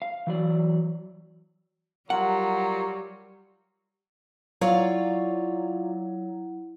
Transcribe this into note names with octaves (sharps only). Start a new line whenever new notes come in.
F5
E3 F#3 D5
F#3 G3 F4 A#4 F#5
F#3 E4 F4 C#5 D5 F#5